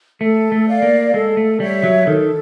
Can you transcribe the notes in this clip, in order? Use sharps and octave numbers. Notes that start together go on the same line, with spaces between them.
A3 A4
A3
D5 F5
A#3
G#3 A4
A3
G3 C#5 E5
F#3
D#3 A4